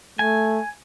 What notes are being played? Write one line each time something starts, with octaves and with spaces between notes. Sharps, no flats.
A3 G#5